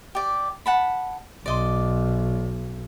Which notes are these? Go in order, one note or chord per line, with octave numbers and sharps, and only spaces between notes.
G4 D5
F#5 A5 B5
B1 D5 D#5 C6